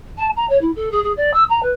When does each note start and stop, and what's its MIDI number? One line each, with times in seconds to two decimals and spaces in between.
0.17 0.29 81
0.36 0.47 82
0.49 0.59 73
0.61 0.71 64
0.75 0.89 69
0.91 1.01 68
1.03 1.12 68
1.17 1.31 74
1.33 1.43 88
1.49 1.60 82
1.62 1.72 71